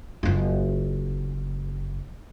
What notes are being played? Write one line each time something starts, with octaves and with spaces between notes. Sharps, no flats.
F#1 F4